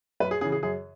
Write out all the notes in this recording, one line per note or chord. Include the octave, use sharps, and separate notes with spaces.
F#2 B4
G#4
C#3 E3 G#4
G#4
F#2 G#4